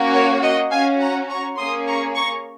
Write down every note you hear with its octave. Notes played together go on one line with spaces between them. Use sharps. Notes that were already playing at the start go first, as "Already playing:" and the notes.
Already playing: A#3 C#4 F#4
A#4 C#5
D#5 F#5
C#4 F#4 F5 G#5
F#5 A#5
A#5 C#6
A#3 C#4 G#4 C6 D#6
A#5 C#6
A#5 C#6